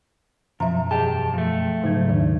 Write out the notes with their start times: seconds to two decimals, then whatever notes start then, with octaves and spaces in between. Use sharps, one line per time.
0.60 F#2 B2 F3 E5 A#5
0.91 E2 G4 G#4 D#5 A5
1.34 F3 A3
1.84 G#2 C#3 F#3 D#4 G#6
2.09 D#2 D#3